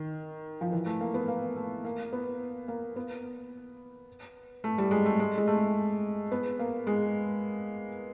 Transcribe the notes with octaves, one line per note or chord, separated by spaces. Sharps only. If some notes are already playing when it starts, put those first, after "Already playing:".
Already playing: D#3
F3
E3
A3
A#3
B3
A#3
A3
A#3
B3
A#3
B3
A3
G3
G#3
A3
G#3
G#3
A3
B3
A#3
G#3